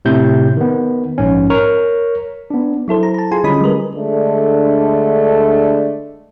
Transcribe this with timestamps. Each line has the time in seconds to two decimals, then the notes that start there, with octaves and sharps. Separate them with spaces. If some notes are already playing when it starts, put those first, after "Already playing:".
0.05 A2 C3 G6
0.57 D#3 B3
1.18 A#1 G#2 C#4
1.50 A#4 C#5 A#5 C#6
2.50 B3 D4
2.88 F#3 E4 A4 C5
3.03 A#5
3.14 A5 A#5
3.32 F4 G#4 G#5 C6
3.44 D3 G3 C#4 D#5 B5 D#6
3.61 G3 G#3 A#4 B4
3.94 D3 G#3 A3 D4